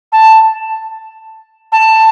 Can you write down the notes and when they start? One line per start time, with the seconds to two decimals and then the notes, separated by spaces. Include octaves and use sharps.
0.12 A5
1.71 A5